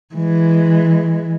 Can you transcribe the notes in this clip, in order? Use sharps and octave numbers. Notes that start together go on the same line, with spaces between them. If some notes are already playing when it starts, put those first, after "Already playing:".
E3 G#3